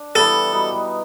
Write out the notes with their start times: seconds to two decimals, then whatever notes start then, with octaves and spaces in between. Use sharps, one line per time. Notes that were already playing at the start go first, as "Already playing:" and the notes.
Already playing: D4
0.15 E3 G3 B3 A4
0.52 B2 G3 B3 D#4